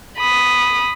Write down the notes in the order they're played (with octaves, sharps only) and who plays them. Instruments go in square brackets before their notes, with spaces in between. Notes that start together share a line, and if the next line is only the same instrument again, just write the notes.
[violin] B5 D#6